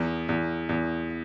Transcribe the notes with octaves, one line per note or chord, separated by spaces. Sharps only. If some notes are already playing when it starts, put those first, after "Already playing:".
Already playing: E2
E2
E2